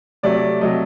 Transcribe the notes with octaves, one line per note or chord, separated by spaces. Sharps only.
C3 F#3 A3 D5
C3 F#3 A3 D#5